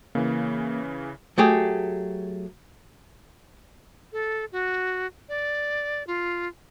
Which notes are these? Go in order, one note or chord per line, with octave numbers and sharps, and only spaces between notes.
C#3 E3 A#3
F#3 A3 G4 G#4
A4
F#4
D5
F4